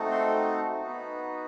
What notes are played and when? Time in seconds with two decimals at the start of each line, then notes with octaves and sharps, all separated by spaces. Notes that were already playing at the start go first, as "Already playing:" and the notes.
Already playing: A3 C4 D#4 F#4 A4
0.11 C6
0.81 B3 D#4 F#4